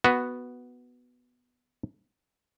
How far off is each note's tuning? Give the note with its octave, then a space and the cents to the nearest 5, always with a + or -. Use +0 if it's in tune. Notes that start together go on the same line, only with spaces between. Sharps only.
B3 +0 F#4 +0